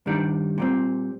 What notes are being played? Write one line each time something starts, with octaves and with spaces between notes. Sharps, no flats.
G2 D#3 G3 D4
A#2 G3 C4